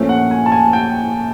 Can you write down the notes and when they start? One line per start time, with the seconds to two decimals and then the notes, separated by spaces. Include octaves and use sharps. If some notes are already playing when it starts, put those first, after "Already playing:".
Already playing: A#2 F3 A3 C#4
0.09 F#5
0.31 G#5
0.46 A5
0.52 G#5
0.73 G5